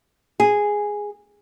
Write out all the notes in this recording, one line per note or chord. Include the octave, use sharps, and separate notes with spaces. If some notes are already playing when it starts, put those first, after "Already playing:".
G#4